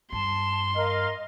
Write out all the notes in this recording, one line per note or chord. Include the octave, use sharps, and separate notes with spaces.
G2 A5 C6
A#4 D#5 F5